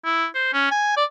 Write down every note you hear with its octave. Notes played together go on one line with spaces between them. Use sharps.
E4
C5
C#4
G#5
D5